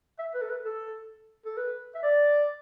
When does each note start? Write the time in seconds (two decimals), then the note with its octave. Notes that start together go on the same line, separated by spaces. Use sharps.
0.19 E5
0.34 B4
0.42 A4
0.50 B4
0.65 A4
1.46 A4
1.57 B4
1.95 E5
2.03 D5